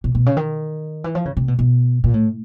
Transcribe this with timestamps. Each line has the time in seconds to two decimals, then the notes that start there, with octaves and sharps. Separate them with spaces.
0.04 B2
0.15 B2
0.26 C#3
0.37 D#3
1.04 E3
1.15 F3
1.25 C#3
1.37 C3
1.48 B2
1.59 B2
2.04 A#2
2.14 A2